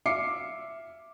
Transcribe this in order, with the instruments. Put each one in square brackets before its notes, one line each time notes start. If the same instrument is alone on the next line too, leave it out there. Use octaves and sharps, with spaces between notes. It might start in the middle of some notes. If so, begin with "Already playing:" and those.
[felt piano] E5 F5 D6 C7 C#7